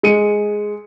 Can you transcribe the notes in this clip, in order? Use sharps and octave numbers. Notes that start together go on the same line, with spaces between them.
G#3 C#7 D#7